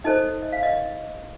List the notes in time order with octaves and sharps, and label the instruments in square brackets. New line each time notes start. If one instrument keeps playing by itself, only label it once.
[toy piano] D#4 A4 C5 D#5
D#5
F5
D#5